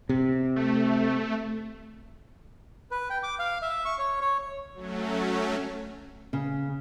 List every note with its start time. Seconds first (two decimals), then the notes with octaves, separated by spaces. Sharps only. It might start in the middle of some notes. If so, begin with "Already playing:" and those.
0.09 C3
0.56 A3
2.91 B4
3.10 G5
3.23 D6
3.39 F5
3.62 E5
3.85 C#6
3.98 C#5
4.21 C#5
4.74 F#3 A3 C#4
6.33 C#3